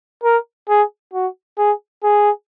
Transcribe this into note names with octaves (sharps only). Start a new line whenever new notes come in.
A#4
G#4
F#4
G#4
G#4